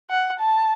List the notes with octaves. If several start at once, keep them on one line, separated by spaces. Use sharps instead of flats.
F#5
A5